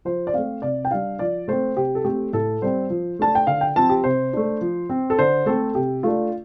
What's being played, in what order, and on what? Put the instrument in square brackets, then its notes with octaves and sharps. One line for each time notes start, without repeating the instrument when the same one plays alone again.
[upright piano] F3 C5
D5
A3 C4 F5
C3 D5
G5
G3 D4 F5
F3 D5
A3 C4 C5
C3 G4
A4
A3 C4 G4
A2 A4
G3 C4 C5
F3
A3 D4 A5
G5
D3 F5
G5
F3 C4 A5
G4
C3 C5
A3 D4
F3
C4
A4
D3 C5
A3 C4 A4
C3 G4
A3 D4 F4